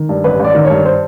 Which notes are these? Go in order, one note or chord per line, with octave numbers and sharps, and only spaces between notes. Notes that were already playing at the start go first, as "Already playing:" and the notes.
Already playing: D#3
G2
A1 B4
A1 D5
D#3
C#5
G2
C5